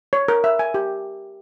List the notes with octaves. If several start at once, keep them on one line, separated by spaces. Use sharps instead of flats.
C#5
A#4
E5
G#5
G4